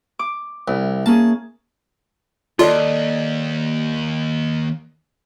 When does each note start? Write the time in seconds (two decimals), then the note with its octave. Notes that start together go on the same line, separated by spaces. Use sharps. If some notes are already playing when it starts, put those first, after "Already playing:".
0.19 D6
0.68 C2 E4
1.06 A#3 C#4 G#4 A5
2.59 D#2 F4 A4 D5 D#5